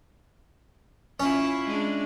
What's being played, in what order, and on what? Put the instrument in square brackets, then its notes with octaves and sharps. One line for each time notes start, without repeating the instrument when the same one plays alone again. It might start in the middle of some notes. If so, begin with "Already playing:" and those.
[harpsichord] C#4 [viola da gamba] E4 F4
[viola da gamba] G#3 D4